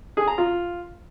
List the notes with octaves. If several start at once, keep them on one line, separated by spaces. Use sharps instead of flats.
G#4
A#5
F4